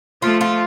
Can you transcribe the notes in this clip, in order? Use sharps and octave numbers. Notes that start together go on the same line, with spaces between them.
F3 A3 F4
F4